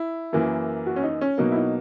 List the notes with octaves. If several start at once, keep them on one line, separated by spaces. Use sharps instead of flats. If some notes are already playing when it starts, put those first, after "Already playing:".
Already playing: E4
F#2 E3 A#3
F#4
C#4
D#4
C#4
B2 F#3 A#3 D#4
E4
D#4